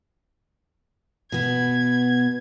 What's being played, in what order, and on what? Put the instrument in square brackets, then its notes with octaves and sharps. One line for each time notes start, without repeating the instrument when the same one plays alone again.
[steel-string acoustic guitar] B2 B3 [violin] G#6